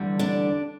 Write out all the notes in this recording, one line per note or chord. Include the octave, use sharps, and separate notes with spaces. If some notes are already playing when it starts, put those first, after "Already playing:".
Already playing: E2 D3 G3
D4 D5